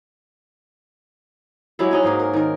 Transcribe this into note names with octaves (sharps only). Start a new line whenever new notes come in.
F#3 G#3 E4 G4
C#4 D#4 F#4
G#2 A#3 G#4 A#4
A#4
D#3 A#4